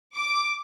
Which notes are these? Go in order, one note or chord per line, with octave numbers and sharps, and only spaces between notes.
D6